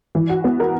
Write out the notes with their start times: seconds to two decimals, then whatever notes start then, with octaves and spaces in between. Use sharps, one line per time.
0.15 E3
0.29 F#4
0.44 B3
0.60 A#4